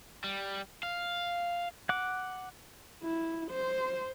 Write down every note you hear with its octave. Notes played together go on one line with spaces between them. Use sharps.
G3
F5
F#5 D6
E4
C5